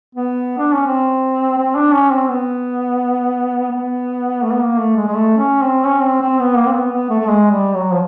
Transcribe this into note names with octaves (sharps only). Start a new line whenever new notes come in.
B3
D4
C#4
C4
C4
D4
C#4
C4
B3
B3
A3
B3
A#3
A3
G#3
G#3
A3
C#4
C4
C#4
C4
C4
B3
A#3
C4
B3
B3
A3
A3
G#3
G3
F#3
F3